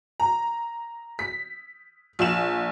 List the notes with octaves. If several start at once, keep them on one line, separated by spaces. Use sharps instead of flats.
A#5
B6
A#1 E7